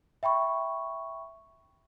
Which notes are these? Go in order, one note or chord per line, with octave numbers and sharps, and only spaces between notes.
E5 G5 B5 C#6